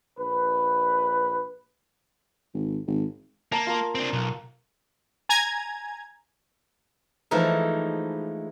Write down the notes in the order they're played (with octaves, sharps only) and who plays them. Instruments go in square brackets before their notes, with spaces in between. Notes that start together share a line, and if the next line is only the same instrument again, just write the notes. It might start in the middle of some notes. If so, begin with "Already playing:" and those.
[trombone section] A#1 B4
[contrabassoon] G#1
G#1
[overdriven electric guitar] A#3 [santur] A5 A#5
[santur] F4 A#4
[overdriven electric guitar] C4 D4
B1
[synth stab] G#5 A#5 G#6
[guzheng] E3 F3 G#3 A3 D#4